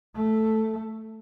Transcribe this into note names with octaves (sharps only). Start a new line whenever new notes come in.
A3